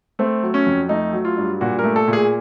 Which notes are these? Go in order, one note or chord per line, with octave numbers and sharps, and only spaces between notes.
A3 C4
F#3
C#4
F2
A3 D#4
F#3
F4
G2
A#2 F#4
A3 A#4
A4
A#2
G#4